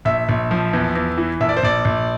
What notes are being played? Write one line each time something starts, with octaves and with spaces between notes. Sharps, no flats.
A#1 E5
A#1
F3
E2
E2
E3
A#1 E5
D5
C5
A#1 D5
A#1